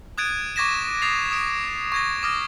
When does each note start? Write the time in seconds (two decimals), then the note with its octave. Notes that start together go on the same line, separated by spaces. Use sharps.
0.18 D#6 F#6 G#6 A6 D7 D#7
0.56 C#6 D6 G#6 A#6 B6 E7
1.02 D#6 A6 C7 F7
1.31 D#6 D7 E7
1.92 C#6 G#6 A#6
2.23 D6 D#6 F6 A#6